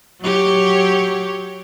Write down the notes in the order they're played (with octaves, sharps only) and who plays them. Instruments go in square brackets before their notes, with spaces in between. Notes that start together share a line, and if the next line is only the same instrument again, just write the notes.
[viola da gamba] F#3 G4 C#5